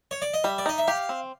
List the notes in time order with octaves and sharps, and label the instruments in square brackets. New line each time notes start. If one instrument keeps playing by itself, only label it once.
[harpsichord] C#5
D5
D#5
[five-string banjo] G3 [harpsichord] E5
[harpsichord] D5
[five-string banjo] D#4 [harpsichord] D#5
[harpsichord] E5
[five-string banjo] G4 [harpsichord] F5
[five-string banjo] C4